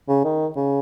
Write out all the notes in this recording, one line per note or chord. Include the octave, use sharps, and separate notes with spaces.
C#3
D#3
C#3